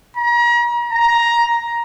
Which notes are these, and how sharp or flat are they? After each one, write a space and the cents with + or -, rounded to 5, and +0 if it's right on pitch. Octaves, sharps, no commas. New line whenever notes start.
A#5 +35
A#5 +10